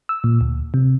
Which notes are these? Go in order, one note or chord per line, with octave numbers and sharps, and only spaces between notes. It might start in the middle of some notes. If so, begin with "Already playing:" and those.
E6
A#2
D2
C3